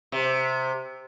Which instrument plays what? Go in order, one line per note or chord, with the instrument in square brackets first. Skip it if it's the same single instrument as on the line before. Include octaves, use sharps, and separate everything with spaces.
[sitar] C3